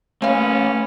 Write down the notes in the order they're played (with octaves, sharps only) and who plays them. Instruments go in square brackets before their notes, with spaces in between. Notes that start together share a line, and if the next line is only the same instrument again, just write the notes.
[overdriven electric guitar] A3 B4 [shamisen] A#3 F5 [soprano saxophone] C#4